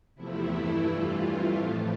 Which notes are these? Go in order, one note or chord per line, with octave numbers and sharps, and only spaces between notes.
E2 C3 F3 A3 E4
G2 E3 A3
F2 E3 G3 F4
F2 E3 A3
A2 F3 A3